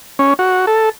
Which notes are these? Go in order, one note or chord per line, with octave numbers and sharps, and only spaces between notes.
C#4
F#4
A4